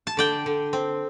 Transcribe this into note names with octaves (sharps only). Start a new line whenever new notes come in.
A5
D3 D5 G5
D3
C4